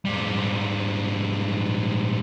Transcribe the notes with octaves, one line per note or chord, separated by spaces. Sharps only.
G#2 G3